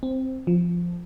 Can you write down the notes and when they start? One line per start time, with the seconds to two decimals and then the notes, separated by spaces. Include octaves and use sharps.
0.03 C4
0.47 F3